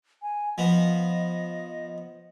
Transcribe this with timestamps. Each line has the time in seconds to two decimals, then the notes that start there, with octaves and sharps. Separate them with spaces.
0.22 G#5
0.58 F3 B3 D#5